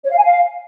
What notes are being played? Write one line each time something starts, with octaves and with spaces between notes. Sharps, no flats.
C#5
F5
G#5
F5